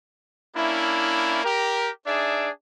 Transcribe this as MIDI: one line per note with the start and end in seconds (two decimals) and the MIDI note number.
0.56 1.41 58
0.56 1.41 61
0.56 1.41 62
0.56 1.41 64
1.44 1.90 67
1.44 1.90 70
2.07 2.49 62
2.07 2.49 63
2.07 2.49 68
2.07 2.49 74
2.07 2.49 76